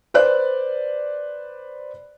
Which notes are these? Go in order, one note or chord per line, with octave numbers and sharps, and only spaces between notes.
B4 C5 D5 F#6